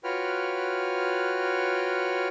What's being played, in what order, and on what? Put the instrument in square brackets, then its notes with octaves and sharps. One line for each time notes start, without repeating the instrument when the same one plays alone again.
[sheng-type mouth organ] F4 F#4 B4 C#5 G5 F6